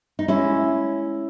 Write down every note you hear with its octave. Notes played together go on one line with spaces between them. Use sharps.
D#4
G#3 C#4 E4